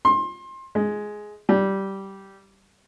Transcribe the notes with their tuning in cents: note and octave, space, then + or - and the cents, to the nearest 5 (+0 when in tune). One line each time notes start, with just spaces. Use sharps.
C6 +25
G#3 +10
G3 -15